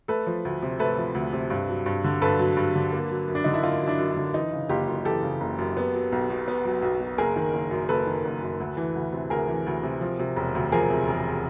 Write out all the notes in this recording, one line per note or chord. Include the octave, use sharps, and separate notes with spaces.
A3 A4 B4
F3
D2
C3
A3 A4 B4
F3
D2
C3
G2
F#3
G2
D3
G2 A4 B4
F#3
G2
D3
A#3
F#3
F#2
D4
D3 D#4
E4
A#3 D#4 F4
F#3
D4 E4
F#2
D4
D3
E3 D#4
C#3
F#1 F4 G4
F#2
E3 G4 A4
C#3
F#1
F#2
B3
F#3
B1
B2
B3
F#3
B1
B2
F#1 G#4 A#4
D#3
F#1
F#2
F#1 A4 B4
D#3
F#1
F#2
D2
E3
D2
C3
D2 G#4 A#4
E3
D2
C3
F3
C3
E1
D2
F3 G#4 A#4
C3
E1